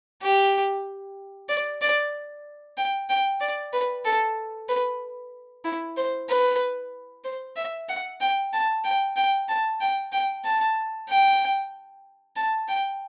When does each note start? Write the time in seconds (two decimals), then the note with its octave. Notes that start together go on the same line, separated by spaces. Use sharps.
0.22 G4
1.49 D5
1.81 D5
2.77 G5
3.09 G5
3.41 D5
3.73 B4
4.05 A4
4.69 B4
5.65 E4
5.97 C5
6.29 B4
7.24 C5
7.56 E5
7.89 F#5
8.21 G5
8.53 A5
8.84 G5
9.16 G5
9.49 A5
9.81 G5
10.12 G5
10.45 A5
11.09 G5
12.36 A5
12.68 G5